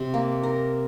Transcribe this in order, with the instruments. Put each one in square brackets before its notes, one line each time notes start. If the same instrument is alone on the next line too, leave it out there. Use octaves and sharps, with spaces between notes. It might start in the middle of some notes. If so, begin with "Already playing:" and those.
Already playing: [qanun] C3
A#3
A#4